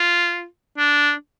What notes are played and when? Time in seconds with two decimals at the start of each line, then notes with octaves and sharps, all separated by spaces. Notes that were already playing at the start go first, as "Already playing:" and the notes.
Already playing: F4
0.78 D4